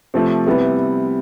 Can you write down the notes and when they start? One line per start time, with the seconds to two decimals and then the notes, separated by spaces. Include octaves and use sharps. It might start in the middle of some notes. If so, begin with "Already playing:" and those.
0.14 C3 F3 A3
0.46 C3 G3 B3 E4